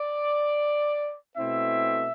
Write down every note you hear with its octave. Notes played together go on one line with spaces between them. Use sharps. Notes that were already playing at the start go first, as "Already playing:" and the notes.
Already playing: D5
B2 A3 C4 E4 E5